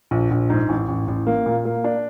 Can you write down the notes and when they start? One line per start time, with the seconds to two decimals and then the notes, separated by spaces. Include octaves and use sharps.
0.11 A#1
0.31 A#1
0.50 G#2
0.69 A1
0.88 A1
1.08 A1
1.27 A#3
1.46 A#2
1.65 A#3
1.84 D4